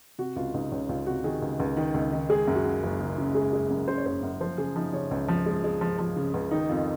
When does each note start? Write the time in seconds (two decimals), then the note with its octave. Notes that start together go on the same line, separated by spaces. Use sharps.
0.18 C3 F#4
0.36 C#2 F4
0.54 C#2 D#4
0.72 C#2 C#4
0.89 C#2 F4
1.06 C3 F#4
1.24 D#3 G#4
1.42 C#2
1.60 C#2
1.77 D#3
1.94 C#2
2.12 D#3
2.30 G#3 G#4
2.48 F#2
2.55 F#4
2.65 C#3
2.83 F#1
3.01 C#3
3.18 C#3
3.35 G#3 G#4
3.53 G#3
3.70 F#2
3.88 C#3 C5
3.98 C#5
4.05 F#1 C5
4.23 F#2
4.41 F3 C5
4.58 C#3 G#4
4.76 F3 D#4
4.93 C#3 C#4
5.11 C#2
5.28 F3
5.46 G#3
5.64 G#3
5.81 F3
5.99 F3
6.17 C#3
6.34 C#2
6.51 D#3 D#4
6.69 F2 F4